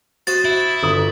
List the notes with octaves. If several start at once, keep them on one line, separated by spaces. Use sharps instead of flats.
F#4 C5 D#5 A6
E4
G1 D#6